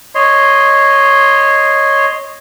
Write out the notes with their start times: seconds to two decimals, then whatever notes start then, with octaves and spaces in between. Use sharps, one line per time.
0.15 C#5 D#5 C6